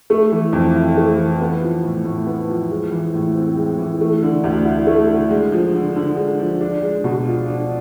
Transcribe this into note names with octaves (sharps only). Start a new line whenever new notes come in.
A3
E3
F2
E4
A3
E3
B3
F3
A2
A2
B3
F3
G#3
E3
A2
C4
G#3
E3
A3
D3
D2
E4
A3
D3
G#3
F3
D3
D3
G#3
F3
D4
G#3
B2
F4
D4